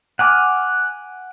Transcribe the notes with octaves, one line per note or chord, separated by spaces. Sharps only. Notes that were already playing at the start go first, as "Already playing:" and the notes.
F#5 G#5 D6 F6